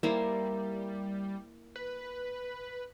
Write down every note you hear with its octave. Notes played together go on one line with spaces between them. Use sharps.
G3 A#3 E4 C5
B4